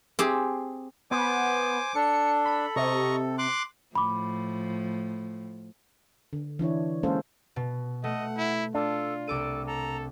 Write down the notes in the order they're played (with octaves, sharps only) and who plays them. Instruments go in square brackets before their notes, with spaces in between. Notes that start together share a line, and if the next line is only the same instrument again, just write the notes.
[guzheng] C4 G4 G#4
[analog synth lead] B3 [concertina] C5 G#5 [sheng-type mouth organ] D6
[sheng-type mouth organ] D4 [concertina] A4 [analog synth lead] C#7
[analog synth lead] B5
[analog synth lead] C3 [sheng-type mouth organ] D#5 A#5 C#6
[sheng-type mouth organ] C6 D6 F#6
[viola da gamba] A2 F3 [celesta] B5 D6
[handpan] D3
E3 D4 E4 C#5
G#3 A#3 C#4 A4 C5 F5
[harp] B2
[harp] A3 [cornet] D#5 [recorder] F#5
[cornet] E4
[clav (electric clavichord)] D4 [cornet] F4 [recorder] A4
[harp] C2 D6 D#7 [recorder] A4
[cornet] A4 [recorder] A#5